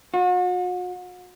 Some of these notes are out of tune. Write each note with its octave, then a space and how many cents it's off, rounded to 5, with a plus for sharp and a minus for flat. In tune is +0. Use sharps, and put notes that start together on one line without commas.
F#4 -40